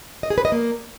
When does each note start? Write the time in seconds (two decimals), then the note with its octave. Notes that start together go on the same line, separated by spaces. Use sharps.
0.23 D#5
0.30 G#4
0.38 B4
0.45 D#5
0.52 A#3